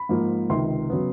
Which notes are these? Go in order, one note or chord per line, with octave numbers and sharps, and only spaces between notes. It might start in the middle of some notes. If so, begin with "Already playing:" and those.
Already playing: B5
G#2 F3 A#3
C#2 C3 D#3 C6
C#3 F#3 B3